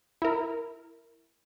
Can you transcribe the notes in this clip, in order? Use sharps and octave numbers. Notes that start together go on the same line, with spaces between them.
E4 A#4